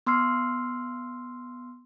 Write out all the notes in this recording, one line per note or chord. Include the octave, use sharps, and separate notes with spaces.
B3 C6 E6 F6 C7